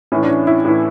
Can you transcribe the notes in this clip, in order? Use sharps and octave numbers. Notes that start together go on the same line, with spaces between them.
A2 E3 C#4
D4
C#4
E4
A2 E3